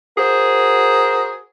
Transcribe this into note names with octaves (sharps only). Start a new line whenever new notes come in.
F#4 G#4 A#4 C5